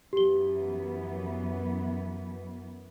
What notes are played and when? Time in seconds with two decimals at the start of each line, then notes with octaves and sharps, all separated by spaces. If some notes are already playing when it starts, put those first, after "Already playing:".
0.13 F#2 E3 B3 G4 G7